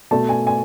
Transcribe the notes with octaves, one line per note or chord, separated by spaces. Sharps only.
B2 A3 A5
G#5
G#5